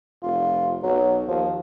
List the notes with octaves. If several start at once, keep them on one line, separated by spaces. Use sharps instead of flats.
F1 F4
B1 F#3
D#2 F3